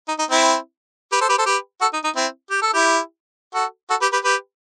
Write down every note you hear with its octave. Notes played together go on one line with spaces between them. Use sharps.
D#4
D#4
C4 E4
G4 B4
A4 C5
G4 B4
A4 C5
G4 B4
F#4 A4
D#4
D#4
C4 E4
G4
A4
E4 G4
F#4 A4
F#4 A4
G4 B4
G4 B4
G4 B4